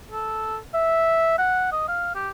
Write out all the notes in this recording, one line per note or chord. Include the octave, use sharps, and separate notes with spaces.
A4
E5
F#5
D#5
F5
G4